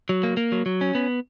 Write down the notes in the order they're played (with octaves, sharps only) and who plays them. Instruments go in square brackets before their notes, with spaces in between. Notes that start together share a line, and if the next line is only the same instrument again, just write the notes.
[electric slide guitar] F#3
A#3
A#3
F#3
F#3
C#4
B3